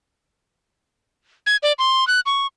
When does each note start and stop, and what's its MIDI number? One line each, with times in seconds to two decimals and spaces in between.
1.46 1.57 92
1.63 1.72 74
1.79 2.07 84
2.07 2.20 90
2.26 2.47 85